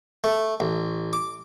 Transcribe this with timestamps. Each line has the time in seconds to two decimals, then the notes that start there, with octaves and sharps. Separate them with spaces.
0.24 A3
0.60 A1
1.13 D6